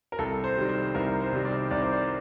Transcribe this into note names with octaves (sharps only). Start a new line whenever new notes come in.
A#4
C2 A4
C5
C3 D#3 G3
C5
C2 A#4
C5
C3 D#3 G3
D5
C2 D5
C5
D5